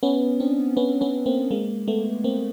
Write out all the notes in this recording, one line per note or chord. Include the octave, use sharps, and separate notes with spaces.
B3 C#4
C4 D4
B3 C#4
B3 C#4
A#3 C4
G#3 A#3
A3 B3
A#3 C4